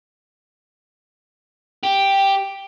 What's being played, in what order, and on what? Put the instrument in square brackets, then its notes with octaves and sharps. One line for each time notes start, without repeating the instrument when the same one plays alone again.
[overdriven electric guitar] G4